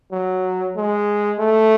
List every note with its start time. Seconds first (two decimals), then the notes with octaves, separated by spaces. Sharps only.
0.12 F#3
0.76 G#3
1.39 A3